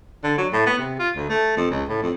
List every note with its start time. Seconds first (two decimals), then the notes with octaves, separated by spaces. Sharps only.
0.24 D3
0.38 F#3
0.53 A2
0.66 B3
0.79 C3
0.99 F4
1.16 D2
1.29 A3
1.57 F2
1.70 C#2
1.88 A2
2.02 F2